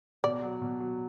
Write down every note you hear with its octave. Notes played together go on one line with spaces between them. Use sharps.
B2 D5
F#3
B2
F#3